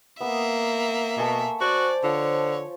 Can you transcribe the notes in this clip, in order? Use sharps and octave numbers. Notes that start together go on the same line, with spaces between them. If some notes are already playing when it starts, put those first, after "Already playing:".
A#3 B3 E5 D#6
B2 A4 G#5 C#6
F#4 C5 D5
D3 F3 C#5